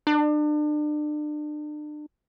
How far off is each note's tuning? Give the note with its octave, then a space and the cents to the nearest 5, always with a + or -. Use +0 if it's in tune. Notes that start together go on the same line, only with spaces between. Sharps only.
D4 +35